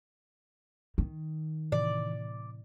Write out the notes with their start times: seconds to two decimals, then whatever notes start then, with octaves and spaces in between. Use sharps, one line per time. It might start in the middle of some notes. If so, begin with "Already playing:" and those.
0.98 D#3
1.72 A2 C3 E3 D5